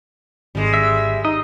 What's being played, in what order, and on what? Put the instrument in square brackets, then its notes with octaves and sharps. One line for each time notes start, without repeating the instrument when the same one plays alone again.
[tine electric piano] G#1 [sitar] G3 G#3
[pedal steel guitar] E5
[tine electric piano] D#4 [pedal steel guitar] D#5